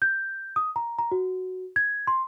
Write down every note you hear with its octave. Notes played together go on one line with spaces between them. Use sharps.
G6
D#6
A#5
A#5
F#4
G#6
C6